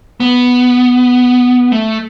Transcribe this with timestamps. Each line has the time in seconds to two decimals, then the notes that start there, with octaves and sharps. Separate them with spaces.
0.20 B3
1.72 A3